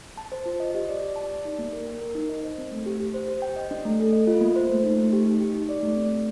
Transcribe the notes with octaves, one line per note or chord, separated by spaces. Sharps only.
A5
C5
F4
D#5
G4
D5
G4
A5
D5
D#4
A#3
A#4
G5
A#4
D#4
D#5
C5
C4
A3
G4
G4
C5
G4
G5
D#5
D4
A3
A4
D#5
F4
A#3
C5
A3
D#4
A3
G4
D#4
G4
D#4
D5
A3
C4
A3